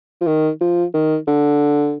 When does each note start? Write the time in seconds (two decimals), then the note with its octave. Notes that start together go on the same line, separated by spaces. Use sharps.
0.21 F3
0.27 D#3
0.61 F3
0.94 D#3
1.27 D3